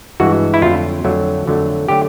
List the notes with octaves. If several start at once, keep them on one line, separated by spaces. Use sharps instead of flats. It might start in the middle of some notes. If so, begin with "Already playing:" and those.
G2 E3 G#3 F#4
E4
F2 D3 F#3 A3 F4
F2 D3 F#3 A3
F2 D3 F#3 A3
D3 F#3 A3 G4